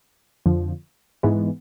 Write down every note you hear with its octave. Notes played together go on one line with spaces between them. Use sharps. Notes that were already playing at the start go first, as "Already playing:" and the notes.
F2 D3 F3
G#2 E3 G#3 B3